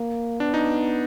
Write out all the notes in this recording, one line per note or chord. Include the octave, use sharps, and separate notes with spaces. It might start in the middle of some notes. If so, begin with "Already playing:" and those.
Already playing: A#3
B3 D4
D#4